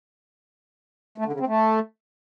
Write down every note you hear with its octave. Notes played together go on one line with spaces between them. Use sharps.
A3
D3
C#3
C4
A3